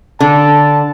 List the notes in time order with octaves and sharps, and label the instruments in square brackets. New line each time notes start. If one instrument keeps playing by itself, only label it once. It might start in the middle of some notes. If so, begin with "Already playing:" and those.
[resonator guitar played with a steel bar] D3 [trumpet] A5